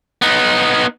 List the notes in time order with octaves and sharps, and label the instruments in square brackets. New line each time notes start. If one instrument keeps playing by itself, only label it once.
[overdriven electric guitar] B3 D#4